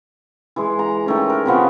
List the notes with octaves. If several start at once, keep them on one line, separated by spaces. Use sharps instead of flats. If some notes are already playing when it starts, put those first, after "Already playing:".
E3 G#3
A#5
D#3 A3 C#4
A#4
C3 F3 B3 C#4